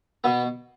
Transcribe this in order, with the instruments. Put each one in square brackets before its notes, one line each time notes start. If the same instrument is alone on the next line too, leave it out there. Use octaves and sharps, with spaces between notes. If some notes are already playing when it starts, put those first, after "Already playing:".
[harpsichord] B2 B3